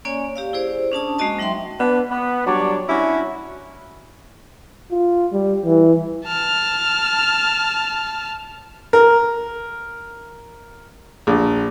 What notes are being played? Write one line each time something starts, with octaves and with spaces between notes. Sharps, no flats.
A#3 C#4 C#5 D5 G#5
G4 D5 F5
E4 G#4 C5 D5
C#4 D4 A5 D#6
G#3 A#3 C#4 F#4 D#5 A5
F#3 D#4 E5 G5 C6
B3 D4
B3
F#3 G3 D4 C#5 D5
C#4 D4 E4 F#4
F4
G3
E3
A5 F6
A#4
A#1